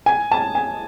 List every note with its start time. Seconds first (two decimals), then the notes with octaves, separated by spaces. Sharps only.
0.06 G#5
0.31 A5
0.55 G#5